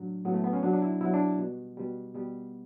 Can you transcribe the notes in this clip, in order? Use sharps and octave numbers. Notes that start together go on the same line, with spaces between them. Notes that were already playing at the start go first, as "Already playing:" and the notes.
Already playing: A2 F#3 D4
A2 F#3 B3
A3
B3
C#4
B2 F#3 D4
D4
E4
B2 F#3 E4
D4
B2 G3
B2 G3
B2 G3 B3